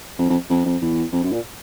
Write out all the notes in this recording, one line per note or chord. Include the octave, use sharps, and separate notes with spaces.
F2
F2
F2
F2
E2
F2
F#2
A#2